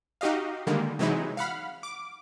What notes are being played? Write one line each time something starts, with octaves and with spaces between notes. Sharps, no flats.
D#4 F#4 G4 D#5 F5
D3 D#3 G3 G#3 A#3
C3 E3 F#3 G#3 D#4 E4
F5 F#5 B5 F6
D6